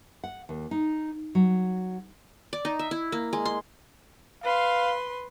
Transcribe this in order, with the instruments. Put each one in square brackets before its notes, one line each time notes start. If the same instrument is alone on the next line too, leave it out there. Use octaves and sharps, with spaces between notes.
[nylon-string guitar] F#5
D#2
D#4
F#3
[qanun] D5
D#4
E5
E4
A#3
G#3
C6
[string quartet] B4 C6 [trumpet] F5